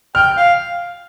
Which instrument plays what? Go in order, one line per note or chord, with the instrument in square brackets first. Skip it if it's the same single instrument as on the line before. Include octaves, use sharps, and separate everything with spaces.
[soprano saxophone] G5 [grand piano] F6
[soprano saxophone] F5